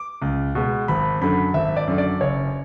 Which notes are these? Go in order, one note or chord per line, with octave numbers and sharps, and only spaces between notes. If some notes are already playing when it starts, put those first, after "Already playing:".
Already playing: D6
C#2
B2 G#3
G#1 B5
F#2 D3 B5
G#1 E5
D5
F#2 D3
D5
F#1 C#5